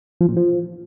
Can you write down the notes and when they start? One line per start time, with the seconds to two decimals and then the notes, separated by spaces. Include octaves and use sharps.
0.21 F3
0.28 A#2
0.36 F3